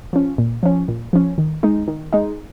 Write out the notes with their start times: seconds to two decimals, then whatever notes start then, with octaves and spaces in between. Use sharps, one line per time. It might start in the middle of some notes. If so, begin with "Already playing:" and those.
0.13 F3 C#4
0.38 A#2
0.63 F3 C#4
0.88 A#2
1.13 F3 C#4
1.38 D#3
1.63 G#3 D#4
1.88 D#3
2.13 G#3 D#4